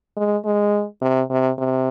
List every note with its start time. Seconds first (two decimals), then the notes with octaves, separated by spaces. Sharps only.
0.17 G#3
0.45 G#3
1.02 C3
1.30 C3
1.58 C3